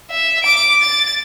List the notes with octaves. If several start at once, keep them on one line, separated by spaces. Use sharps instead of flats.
E5
D6 D7
A6